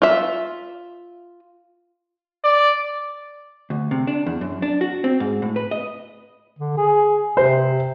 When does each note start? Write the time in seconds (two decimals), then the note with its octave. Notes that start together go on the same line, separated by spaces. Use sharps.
0.02 F4 E5
2.43 D5
3.70 D2
3.91 C3
4.07 D4
4.26 E2
4.41 F#2
4.62 D4
4.81 F#4
5.04 C4
5.20 G#2
5.42 A2
5.56 B4
5.71 D#5
6.59 D3
6.77 G#4
7.37 C3 C5